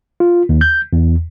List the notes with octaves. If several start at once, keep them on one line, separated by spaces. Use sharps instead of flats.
F4
D#2
G6
E2